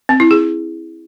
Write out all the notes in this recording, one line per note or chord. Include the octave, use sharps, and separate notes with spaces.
C4
E4
G#4